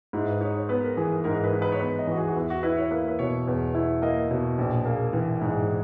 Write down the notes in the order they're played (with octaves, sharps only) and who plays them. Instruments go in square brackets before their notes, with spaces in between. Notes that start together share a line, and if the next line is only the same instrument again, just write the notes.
[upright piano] G#2 [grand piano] E4
[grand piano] B4
[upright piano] D#4 [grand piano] C#5
[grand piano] C#5
[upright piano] B3 [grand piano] B4
[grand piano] A#4
[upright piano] E3 [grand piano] G#4
[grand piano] A#4
[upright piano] G#2 [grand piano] A#4
[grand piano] A#4
B4
[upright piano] D#4
[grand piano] B4
C#5
[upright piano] B3 [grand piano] B4
[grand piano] D#5
[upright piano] E3 [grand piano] F#4
[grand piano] G#4
F#4
[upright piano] E2 [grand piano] E4
[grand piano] F#4
[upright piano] E4 [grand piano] B4
[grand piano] C#5
[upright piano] A#3 [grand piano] B4
[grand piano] B4
[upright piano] B2 [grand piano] C#5
[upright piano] E2
E4
[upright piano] A#3 [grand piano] D#5
[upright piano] B2 [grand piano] C#5
[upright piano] A#1 [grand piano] B4
[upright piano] A#3 [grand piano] G#4
[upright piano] E3 [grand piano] A#4
[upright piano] G#2 [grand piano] G#4
[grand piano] D#4